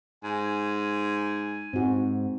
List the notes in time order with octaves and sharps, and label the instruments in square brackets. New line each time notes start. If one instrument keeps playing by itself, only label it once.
[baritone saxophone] G#2 [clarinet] G#5
[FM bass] G#2 [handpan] C4 F#4